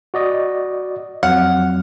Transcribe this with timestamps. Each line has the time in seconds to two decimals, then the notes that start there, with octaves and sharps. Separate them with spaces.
0.14 F#4 D5 D#5
1.23 F2 F#3 F#5 F6